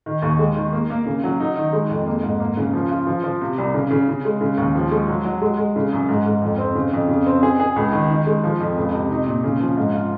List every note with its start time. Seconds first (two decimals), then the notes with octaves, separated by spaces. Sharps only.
0.06 D#3
0.22 D#2
0.39 G#3
0.56 D#3
0.72 A#3
0.90 A#3
1.06 C#3
1.24 F#3
1.40 D#4
1.57 D#3
1.73 G#3
1.90 F2
2.06 A#3
2.23 G#2
2.40 A#3
2.57 C#3
2.73 F3
2.91 F4
3.07 F3
3.24 F3
3.41 C3
3.58 C2
3.74 C#3
3.91 C#3
4.08 C#3
4.25 G#3
4.41 C#3
4.57 D#2
4.75 F3
4.91 G#3
5.08 F#3
5.25 F#3
5.42 G#3
5.58 G#3
5.76 C#3
5.93 F#2
6.09 G#2
6.26 G#2
6.42 F2
6.58 C4
6.75 C#3
6.93 F2
7.09 C#3
7.26 C4
7.43 G#4
7.60 G#4
7.76 C#2
7.92 D#3
8.09 D#3
8.27 G#3
8.44 F3
8.60 F2
8.77 C#2
8.94 C3
9.10 D#4
9.27 A#2
9.44 C#3
9.60 F3
9.77 G#2
9.94 F4